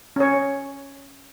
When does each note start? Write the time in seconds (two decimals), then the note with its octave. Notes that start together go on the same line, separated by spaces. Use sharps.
0.16 C#4 C#5